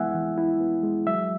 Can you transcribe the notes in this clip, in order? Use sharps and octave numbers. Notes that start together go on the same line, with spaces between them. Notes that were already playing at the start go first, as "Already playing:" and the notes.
Already playing: E3 G#3 B3 E4 E5 F#5 G#5
E3
E4
B3
G#3
F#3 E5